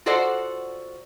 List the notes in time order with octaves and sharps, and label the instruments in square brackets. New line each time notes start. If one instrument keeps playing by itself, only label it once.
[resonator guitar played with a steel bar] F4 F#4 A4 C5 D5 F#5